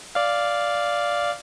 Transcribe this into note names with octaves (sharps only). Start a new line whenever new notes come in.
D5 F5